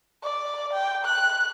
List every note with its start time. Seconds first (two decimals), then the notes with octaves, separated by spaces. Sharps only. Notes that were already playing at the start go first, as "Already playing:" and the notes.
0.23 D5
0.73 G5
1.05 F#6